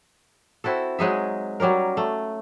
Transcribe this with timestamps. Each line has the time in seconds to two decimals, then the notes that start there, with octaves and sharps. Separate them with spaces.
0.64 C4 E4 F#4 A4
0.99 F#3 G#3 D#4 E5
1.60 F#3 G3 C#4 A#4
1.97 A3